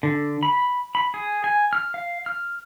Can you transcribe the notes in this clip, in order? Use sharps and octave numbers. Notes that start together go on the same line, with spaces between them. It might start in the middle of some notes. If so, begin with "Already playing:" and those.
D3
B5
B5
G#4
G#5
F6
F5
F6